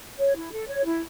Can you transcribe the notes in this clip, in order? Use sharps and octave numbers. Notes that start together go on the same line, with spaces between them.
C#5
E4
A4
C#5
E4